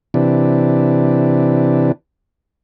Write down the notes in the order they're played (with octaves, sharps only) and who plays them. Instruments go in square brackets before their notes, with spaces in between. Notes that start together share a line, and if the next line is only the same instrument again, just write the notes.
[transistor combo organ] C3 E3 D4